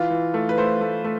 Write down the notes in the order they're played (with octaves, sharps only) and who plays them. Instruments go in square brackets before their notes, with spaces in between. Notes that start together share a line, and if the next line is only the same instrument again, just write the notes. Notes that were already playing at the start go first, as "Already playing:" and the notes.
Already playing: [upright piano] E3 F4
E3
A3
B4
A3 C5
A3
A3